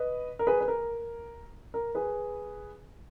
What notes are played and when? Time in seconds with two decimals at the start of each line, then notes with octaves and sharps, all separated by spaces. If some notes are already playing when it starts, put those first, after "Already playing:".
Already playing: B4 D#5
0.39 A#4
0.47 G#4 B4
0.61 B4
0.68 A#4
1.74 A#4
1.95 G#4 B4